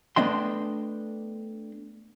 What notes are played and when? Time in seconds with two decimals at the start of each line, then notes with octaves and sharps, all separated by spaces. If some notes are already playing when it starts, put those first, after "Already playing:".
0.16 A3 B3 D4 D#5 G5 C6